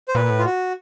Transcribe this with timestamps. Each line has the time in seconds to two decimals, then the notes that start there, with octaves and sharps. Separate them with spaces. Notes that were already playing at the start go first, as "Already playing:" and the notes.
0.08 C5
0.15 A#2 B4
0.30 A2
0.39 F4
0.46 F#4